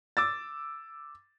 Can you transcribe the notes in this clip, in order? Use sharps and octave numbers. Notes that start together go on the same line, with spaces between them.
D6 E6 A6